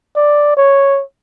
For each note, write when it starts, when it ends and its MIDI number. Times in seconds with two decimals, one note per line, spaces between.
0.16 0.56 74
0.57 1.02 73